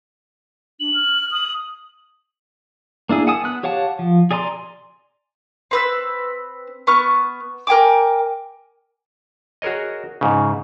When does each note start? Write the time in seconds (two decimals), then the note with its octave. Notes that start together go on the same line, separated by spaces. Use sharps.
0.80 D4 F#7
0.94 F6
1.31 D#6
3.09 A#3 D4 E4 G#4
3.27 F#5 G#5 A5 D#6
3.44 B3 F#6
3.63 G4 C#5 F5 F#5 A5
3.99 F3
4.31 G#4 D5 G#5 A#5 C6
5.71 C4 B4 E6
6.87 B3 C#6 F6 F#6
7.67 A#4 G5 G#5 D6
9.62 F#4 G#4 A#4 C#5 D#5
10.21 G#2 C#3